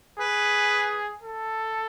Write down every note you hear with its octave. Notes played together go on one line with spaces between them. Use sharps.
G#4 B4
A4